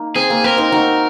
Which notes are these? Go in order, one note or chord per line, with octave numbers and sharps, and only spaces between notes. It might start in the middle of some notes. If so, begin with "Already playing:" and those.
Already playing: A#3 D#4
C4 G#4
A#3
C4 A#4
C4 D#4
D#4 F#4